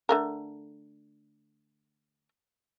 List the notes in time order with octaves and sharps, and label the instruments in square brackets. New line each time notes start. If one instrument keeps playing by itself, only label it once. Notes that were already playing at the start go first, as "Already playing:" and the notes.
[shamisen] D3 A3 A#4